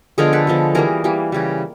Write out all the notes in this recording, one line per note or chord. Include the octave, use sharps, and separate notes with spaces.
D3 F3 G#3 B3 G#4 A#4
A4 B4
D3 F3 G#3 B3
E3 G3 A#3 G#4 A#4
E3 G3 A#3
C#3 E3 G3